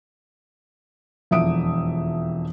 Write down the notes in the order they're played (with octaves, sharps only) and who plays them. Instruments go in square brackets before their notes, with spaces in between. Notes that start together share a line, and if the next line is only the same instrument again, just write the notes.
[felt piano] E1 F2 E5 D#6 D7